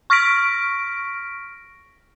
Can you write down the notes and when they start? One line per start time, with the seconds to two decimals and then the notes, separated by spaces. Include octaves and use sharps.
0.10 C#6 F6 A#6 B6 D7